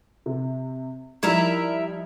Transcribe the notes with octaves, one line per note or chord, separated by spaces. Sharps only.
C3
F3 G3 D#4 E4 A#4 E5